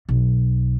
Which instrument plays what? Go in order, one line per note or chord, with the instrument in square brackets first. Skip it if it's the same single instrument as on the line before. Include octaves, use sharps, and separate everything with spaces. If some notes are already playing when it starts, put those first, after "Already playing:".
[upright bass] B1